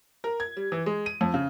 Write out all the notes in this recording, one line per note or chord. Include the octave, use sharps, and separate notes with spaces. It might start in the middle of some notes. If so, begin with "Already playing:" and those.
A#4
G#6
G3
E3
G#3
D#7
F2
C#3